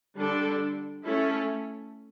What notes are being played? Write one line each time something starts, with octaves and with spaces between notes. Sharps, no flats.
D3 G3 D4 A4
A3 C#4 E4 A4